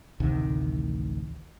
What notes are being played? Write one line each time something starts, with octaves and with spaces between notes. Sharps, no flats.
A1 D2 C3 D#3